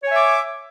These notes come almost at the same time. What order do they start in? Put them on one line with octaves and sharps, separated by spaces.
C#5 G#5 E5 D6